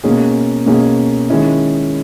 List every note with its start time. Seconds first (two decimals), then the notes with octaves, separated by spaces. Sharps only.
0.04 B2 A#3 C#4 G#4
0.66 B2 A#3 C#4 G#4
1.30 D#3 G#3 C#4 E4